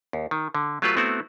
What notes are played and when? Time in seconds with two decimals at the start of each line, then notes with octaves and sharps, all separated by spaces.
0.13 D#2
0.31 D#3
0.55 D3
0.82 F#3 A3 F4 G4 B4
0.97 A3 B3 C4 E4 F#4